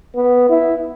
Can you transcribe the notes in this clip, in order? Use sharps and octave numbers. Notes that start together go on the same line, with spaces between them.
B3
E4